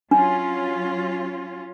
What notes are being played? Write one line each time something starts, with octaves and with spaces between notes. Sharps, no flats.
F#3 C#4 D4 F4